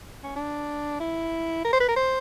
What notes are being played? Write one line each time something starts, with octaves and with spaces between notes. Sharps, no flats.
C#4
D4
E4
A#4
C5
B4
A#4
C5